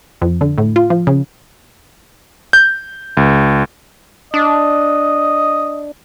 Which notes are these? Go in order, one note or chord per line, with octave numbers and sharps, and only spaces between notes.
F2
D3
A2
F4
F3
C#3
G6
C#2
D4 D#5